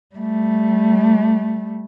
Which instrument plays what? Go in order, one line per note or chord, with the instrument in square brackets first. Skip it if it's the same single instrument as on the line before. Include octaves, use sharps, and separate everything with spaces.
[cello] G3 A3